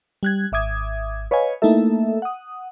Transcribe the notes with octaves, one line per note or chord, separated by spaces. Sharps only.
G3 F#6 G#6
G#1 E5 D6 D#6 G#6
B4 C#5 D#5 F5 G#5
A3 A#3 D#4 E4 A4 E5
F#5 D#6